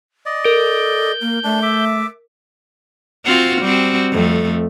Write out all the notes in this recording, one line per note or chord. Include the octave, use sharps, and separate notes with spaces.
D5 D#5
A4 A#4 G6 D7
A#3
A3 D4
E5 D6
C4 F4 F#4
G3 C4 F#4
F2 A3